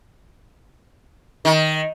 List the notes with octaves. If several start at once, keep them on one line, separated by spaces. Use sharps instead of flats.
D#3